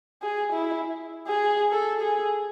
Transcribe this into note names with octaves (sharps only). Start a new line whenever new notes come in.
G#4
E4
G#4
A4
G#4